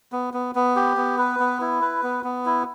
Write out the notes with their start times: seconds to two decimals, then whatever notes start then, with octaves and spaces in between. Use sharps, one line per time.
0.12 B3
0.34 B3
0.55 B3
0.76 G4
0.97 B3
1.18 B4
1.39 B3
1.61 E4
1.82 B4
2.03 B3
2.24 B3
2.46 E4